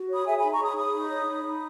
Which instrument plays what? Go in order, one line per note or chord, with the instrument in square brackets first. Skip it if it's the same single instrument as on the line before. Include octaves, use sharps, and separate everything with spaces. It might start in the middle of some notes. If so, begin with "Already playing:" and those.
Already playing: [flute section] F#4
C#5 B5 D#6
G#4 E5 G#5
D#4 G#5 B5
A#5 C#6
C#5 B5 D#6
G#4 B5 D#6
D#4
C#5
D#4
D#4